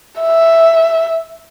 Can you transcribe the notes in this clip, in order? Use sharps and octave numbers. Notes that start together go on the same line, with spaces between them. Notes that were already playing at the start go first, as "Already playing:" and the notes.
E5